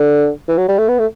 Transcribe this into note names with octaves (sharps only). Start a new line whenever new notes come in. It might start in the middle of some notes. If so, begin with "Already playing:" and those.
Already playing: D3
E3
F#3
G3
A3
B3
A3